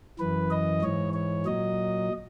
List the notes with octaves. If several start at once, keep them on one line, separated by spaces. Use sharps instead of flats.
F#2 E3 B4
D#5
G#2 E3 C#5
C#5
A#2 F#3 D#5